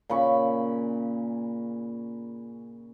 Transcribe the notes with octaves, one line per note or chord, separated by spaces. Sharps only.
A#2 C#3 B5 C#6